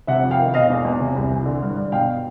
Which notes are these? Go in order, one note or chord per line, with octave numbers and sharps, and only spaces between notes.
C3 E5 F#5
F2
F5 G5
D#3
B2 D#5 F5
E2
E2
C3
C2
E3
D3
G2
G2
B2 F5 G5